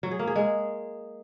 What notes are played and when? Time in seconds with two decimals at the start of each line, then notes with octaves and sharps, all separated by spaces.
0.03 F#3
0.11 G#4
0.19 A#3
0.27 G#4
0.36 G#3